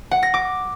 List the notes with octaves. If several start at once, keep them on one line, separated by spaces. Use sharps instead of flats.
F#5
A#6
D6